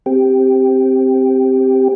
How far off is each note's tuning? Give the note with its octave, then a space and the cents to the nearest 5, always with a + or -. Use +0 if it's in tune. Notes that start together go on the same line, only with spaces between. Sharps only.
C4 +0 G4 +0